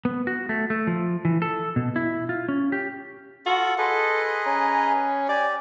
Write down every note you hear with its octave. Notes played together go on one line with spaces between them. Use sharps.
B3
F#4
A3
A3
F3
E3
A4
B2
E4
F4
C#4
G4
F4 F#4 A4
G#4 A4 B4 D#5 C6
C#4 A#5
G4 D5 G#5